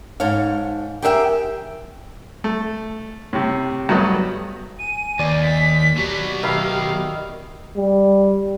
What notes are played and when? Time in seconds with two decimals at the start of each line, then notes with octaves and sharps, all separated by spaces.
0.20 G#2 A4 C#5 F5
1.02 G4 G#4 A#4 E5 F5 G5
2.44 A3
3.33 A2 C3
3.89 G2 F#3 A3 B3 D#5
4.79 G#5 D#7
5.19 D#2 D5
5.43 B6
5.97 B2 F#3 G4
6.43 D#3 E5 F5 B5
7.76 G3